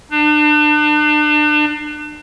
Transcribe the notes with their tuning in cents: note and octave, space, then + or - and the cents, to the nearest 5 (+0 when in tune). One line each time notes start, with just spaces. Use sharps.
D4 +35